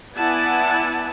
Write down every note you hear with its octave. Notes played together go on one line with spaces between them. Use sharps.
B3 E4 D5 F#5 G#5 A5